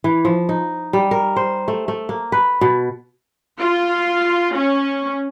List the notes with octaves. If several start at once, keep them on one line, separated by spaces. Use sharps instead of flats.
E3
F3
D#4
G3
A#4
C5
A3
A3
A#3
B4
B2
F4
C#4